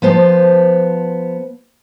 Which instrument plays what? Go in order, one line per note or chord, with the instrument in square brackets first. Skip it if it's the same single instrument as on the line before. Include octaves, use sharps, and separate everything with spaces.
[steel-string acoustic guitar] F3 B3 C5 A5